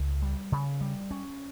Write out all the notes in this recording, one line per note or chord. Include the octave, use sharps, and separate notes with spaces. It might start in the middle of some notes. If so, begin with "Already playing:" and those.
Already playing: C#2
G3
C#3
G3
C#4